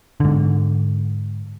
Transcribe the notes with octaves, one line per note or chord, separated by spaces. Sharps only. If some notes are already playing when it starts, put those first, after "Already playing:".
G#2 D3